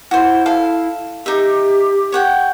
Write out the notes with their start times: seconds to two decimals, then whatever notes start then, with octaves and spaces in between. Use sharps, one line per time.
0.11 E4 F#4 C5
0.46 A4 F5
1.26 D#4 G4 E5
2.12 C#5 F#5 G5